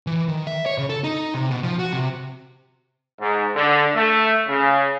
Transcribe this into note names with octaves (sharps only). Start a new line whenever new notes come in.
E3
D#3
E5
C#5
C#3
A4
D#4
C3
B2
F3
F#4
C3
G#2
D3
A3
C#3